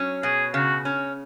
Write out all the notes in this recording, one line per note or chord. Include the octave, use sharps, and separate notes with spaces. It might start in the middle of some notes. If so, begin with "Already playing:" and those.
Already playing: F#3 C#4
B2 G#4
C#3 F#4
C#4